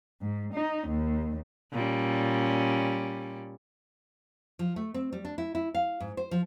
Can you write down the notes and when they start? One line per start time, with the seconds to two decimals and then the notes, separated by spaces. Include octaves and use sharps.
0.22 G#2
0.54 D#4
0.88 D#2
1.72 A#2 G3 C#4
4.59 F3
4.76 A3
4.94 C4
5.12 G3
5.25 D4
5.38 E4
5.55 E4
5.75 F5
6.00 G#2
6.17 C5
6.31 F3